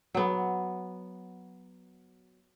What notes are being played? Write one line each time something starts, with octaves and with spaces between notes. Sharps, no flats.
F#3 B3